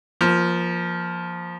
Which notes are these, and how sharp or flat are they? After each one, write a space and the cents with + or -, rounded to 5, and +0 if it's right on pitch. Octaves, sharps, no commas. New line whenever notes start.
F3 +0 A#3 +25